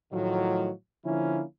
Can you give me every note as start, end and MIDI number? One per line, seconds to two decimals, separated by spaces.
0.12 0.70 45
0.12 0.70 51
0.12 0.70 53
0.12 0.70 54
1.05 1.42 50
1.05 1.42 53
1.05 1.42 58
1.05 1.42 61
1.05 1.42 64